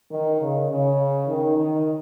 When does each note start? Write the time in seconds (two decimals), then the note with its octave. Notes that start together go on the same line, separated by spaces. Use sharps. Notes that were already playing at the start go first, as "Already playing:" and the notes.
0.10 D#3
0.40 C#3
0.69 C#3
1.28 D#3
1.57 D#3